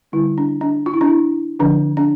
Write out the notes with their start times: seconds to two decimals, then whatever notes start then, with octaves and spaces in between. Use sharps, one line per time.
0.12 D3 G3 C4 E4
0.38 D4
0.61 D4
0.86 F4
0.94 E4
1.01 D4
1.07 E4
1.59 D3 F3 C4 D4
1.97 D4